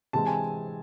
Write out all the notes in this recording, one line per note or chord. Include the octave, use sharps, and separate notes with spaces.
C3 E3 G#3 C4 A5
G#5